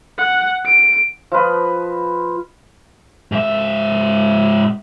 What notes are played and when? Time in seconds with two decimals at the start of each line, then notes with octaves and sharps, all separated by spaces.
0.18 F#5
0.66 D7
1.32 F3 F4 B4 D#5
3.32 G#2 E5